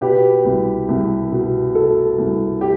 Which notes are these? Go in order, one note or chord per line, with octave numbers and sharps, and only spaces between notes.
B2 G4 B4
C2
C2
B2
B2 A4
C2
G4